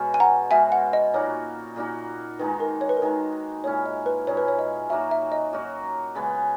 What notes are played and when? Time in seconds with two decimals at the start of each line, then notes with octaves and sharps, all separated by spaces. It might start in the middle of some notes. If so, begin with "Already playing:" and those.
Already playing: B2 G#3 C#4 F#4
0.14 G#5
0.20 F#5 A#5
0.50 B2 G#3 C#4 F#4 E5 G#5
0.72 F#5
0.93 D#5
1.14 A#2 A#3 D#4 F#4 C#5
1.76 A#2 A#3 D#4 F#4
2.39 D#3 G#3 D#4 B4
2.60 A#4
2.81 C#5
2.89 B4
2.97 A#4
3.02 D#3 G#3 D#4 B4
3.64 A#2 G#3 C#4 E4 C#5
3.86 D#5
4.06 B4
4.27 A#2 G#3 C#4 E4 C#5
4.37 B4
4.48 C#5
4.59 D#5
4.89 F#3 A#3 D#4 F#4 E5
5.11 E5
5.32 D#5
5.53 F#3 A#3 D#4 F#4
6.15 C#3 G#3 B3